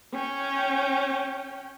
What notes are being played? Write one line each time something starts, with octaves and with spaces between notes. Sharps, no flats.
C#4 G5